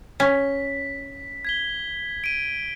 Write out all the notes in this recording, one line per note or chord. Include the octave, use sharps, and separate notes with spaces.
C#4 B6
G#6 B6 G7
D7 D#7